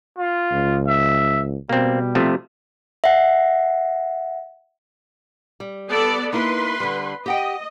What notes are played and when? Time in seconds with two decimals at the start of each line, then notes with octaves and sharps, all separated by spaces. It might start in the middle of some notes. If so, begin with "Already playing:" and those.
0.18 F4
0.52 C#2
0.87 E5
1.69 B2 G3 A#3 C4
2.15 C3 F3 A3
3.04 E5 F#5
5.60 G3
5.89 B3 A4 D5
6.33 A#3 D#4 E4 B4 C6
6.80 D3 G3
7.26 G4 D#5 F#5 G5